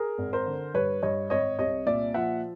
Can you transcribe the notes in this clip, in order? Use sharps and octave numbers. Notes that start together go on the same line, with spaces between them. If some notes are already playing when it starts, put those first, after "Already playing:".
Already playing: G#4 A#4
G#1
A#4 C5
D3
G2 B4 C#5
G2 C#5 D#5
G#1 C#5 D#5
C2 C#5 D#5
A#2 D5 E5
F3 E5 F#5